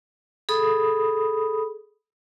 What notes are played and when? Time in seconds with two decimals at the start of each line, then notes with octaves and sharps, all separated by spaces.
0.49 G#4 A4 B5 D#6